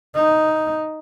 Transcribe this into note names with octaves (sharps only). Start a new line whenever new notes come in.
D#4